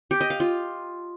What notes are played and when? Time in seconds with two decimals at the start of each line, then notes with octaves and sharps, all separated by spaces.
0.11 G4
0.21 D#5
0.30 F5
0.40 F4